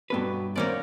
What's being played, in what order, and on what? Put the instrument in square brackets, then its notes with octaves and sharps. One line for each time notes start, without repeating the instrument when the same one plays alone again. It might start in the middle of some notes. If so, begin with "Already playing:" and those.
[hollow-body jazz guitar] G2 B4 [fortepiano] B2 F#3 A4 [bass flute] F#4
[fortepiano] F#2 B2 D#3 [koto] A#3 C#4 D5 [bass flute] C5